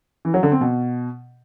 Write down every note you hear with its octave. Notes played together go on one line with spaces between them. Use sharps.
E3
F#3
D3
C4
B2